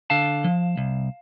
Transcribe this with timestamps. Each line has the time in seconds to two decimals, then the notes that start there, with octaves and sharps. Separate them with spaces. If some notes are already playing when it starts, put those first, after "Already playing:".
0.10 D3 F5 A5
0.44 F3
0.77 C2